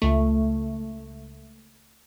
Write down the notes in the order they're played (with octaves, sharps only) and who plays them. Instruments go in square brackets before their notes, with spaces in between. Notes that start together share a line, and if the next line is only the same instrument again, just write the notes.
[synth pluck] C#2 A3